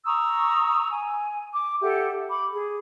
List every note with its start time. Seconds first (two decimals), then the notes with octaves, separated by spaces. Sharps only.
0.05 A#5 C#6 D#6 E6
0.90 G#5
1.53 D6
1.82 G4 A4 E5 F#5
2.28 B5 D6
2.53 G#4